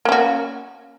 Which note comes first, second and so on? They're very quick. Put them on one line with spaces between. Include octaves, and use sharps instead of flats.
A#3 C#4 F#4